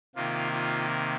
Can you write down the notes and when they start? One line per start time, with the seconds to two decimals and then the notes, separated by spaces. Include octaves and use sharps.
0.15 C3 D#3 A#3 F4
0.52 F4